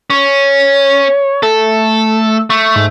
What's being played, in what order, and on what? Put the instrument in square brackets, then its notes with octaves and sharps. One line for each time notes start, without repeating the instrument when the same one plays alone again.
[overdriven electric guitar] C#4 [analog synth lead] C#5
[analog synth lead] A3 [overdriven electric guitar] A4
[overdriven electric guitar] A3 [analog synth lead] C#6
[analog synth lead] G#2